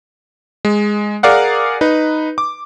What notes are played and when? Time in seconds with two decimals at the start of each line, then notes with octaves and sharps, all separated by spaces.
0.65 G#3
1.23 G#4 A#4 D5 F5 F#5
1.81 D#4 B4
2.38 D6